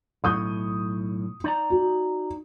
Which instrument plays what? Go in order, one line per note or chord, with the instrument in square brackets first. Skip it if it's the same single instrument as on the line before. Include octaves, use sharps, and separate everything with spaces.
[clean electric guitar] B1 A2 [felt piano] C#6 D#6 G6
[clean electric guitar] D#4 D5 A#5
[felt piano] F#4